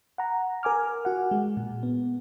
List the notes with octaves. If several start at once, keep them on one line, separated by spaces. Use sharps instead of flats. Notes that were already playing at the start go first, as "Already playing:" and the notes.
F#5 A#5
A#4 G#5 D6 F6
F#4 F#5
G#3
A#2
B3